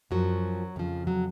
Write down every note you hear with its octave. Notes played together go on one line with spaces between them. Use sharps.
F#2 F3 F#3
F2 C#3 F3
F#3